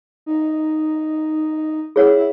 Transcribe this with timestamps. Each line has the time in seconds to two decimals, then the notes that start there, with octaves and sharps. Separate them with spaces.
0.26 D#4
1.96 E4 G#4 C#5 F#5
2.16 E4